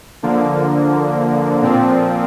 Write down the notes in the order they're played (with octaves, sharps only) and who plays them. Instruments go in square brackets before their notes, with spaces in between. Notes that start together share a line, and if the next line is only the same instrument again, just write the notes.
[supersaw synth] D3 F3 A#3
A#2 F3 C4